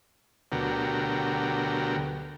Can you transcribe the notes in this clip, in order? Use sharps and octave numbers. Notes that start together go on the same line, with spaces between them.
D2 B2 D3 F#3 G4 A#4